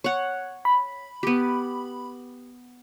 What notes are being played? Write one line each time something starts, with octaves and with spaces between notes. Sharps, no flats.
C#5 F#5
B5
B3 G4